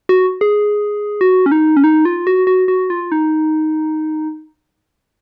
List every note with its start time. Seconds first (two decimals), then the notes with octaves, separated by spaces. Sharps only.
0.09 F#4
0.41 G#4
1.21 F#4
1.46 C#4
1.52 D#4
1.77 C#4
1.84 D#4
2.05 F4
2.27 F#4
2.47 F#4
2.68 F#4
2.90 F4
3.12 D#4